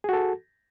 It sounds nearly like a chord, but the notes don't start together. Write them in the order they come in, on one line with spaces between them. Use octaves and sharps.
G#4 F#4 A4